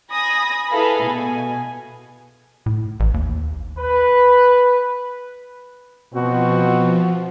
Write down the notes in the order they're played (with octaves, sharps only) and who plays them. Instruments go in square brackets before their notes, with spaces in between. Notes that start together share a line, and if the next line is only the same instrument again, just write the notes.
[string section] G#5 B5 D#6 A#6
E4 G#4 A4 B4 F5 B5
B2 G#5
[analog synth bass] A2
A1
D#2
[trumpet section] B4
[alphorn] B2 [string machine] F3 [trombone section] B3 C4 F#4